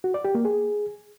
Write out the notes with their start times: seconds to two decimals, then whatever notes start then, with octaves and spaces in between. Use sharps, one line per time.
0.04 F#4
0.14 D5
0.24 G4
0.35 A#3
0.45 G#4